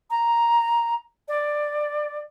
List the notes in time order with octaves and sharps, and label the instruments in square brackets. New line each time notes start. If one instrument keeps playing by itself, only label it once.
[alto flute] A#5
D5